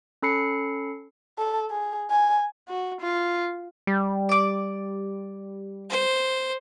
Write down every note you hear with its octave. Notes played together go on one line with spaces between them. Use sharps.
C#4 A4 B5 C7 C#7
A4
G#4
G#5
F#4
F4
G3
D5 D6
C5